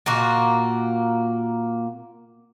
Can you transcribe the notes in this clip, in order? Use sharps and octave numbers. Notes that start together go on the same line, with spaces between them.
A#2 A#3 F#4